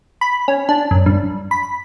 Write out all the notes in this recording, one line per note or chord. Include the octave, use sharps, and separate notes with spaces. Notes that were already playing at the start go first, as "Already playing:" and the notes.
B5
C#4
D4
F#2
G2
B5